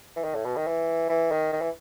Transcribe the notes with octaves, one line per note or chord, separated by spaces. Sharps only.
E3
D#3
A2
B2
D#3
E3
E3
D#3
D#3
E3